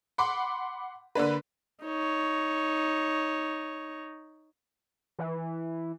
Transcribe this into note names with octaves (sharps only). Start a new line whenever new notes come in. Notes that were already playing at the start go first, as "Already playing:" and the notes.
F#5 B5 C6 D6
D3 A#3 D4 B4
D#4 C#5
E3